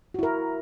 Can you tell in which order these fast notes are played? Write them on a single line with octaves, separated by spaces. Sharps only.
F#4 E4 A#4